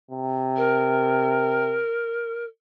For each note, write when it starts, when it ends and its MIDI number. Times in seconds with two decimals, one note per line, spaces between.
0.11 1.81 48
0.56 2.44 70